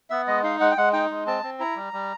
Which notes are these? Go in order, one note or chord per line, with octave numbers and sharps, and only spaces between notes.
B3 E5
G#3 D#5
D#4 F5
G#3 F#5
G5
G#3 F#5
D#4 G5
G#3
C4 A5
C4
E4 A#5
G3
G3